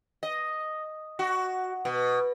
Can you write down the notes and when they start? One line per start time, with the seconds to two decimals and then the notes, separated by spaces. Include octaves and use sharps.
0.23 D#5
1.19 F#4
1.85 B2